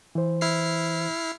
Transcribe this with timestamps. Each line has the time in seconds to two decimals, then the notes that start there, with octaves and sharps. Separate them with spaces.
0.15 E3 C5
0.41 E4 F6 C7